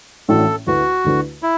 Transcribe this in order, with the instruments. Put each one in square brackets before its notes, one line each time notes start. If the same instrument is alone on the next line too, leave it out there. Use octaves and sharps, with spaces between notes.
[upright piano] A1 A2 A3 D4 F#4 [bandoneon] A4
[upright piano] D2 D3 A3 E4 B4 [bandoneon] F#4
[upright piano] D2 D3 A3 E4 B4
[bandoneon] E4